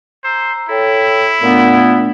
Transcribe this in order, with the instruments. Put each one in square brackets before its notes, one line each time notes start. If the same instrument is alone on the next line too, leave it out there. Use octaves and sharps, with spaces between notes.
[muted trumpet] C5 [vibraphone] A#5 E6
[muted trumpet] E4 [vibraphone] A4 C#5 G5
[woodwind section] A#2 B3 [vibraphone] A3 D4